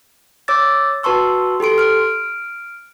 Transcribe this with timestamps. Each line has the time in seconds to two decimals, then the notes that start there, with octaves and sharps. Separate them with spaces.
0.48 C#5 D6 E6 A6
1.03 F#4 B4 A5 C6 C#6 E6
1.60 G4 A4 C6 D7
1.78 F6 D7